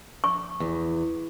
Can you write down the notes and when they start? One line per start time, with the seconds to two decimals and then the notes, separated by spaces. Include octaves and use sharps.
0.24 C#6
0.60 E2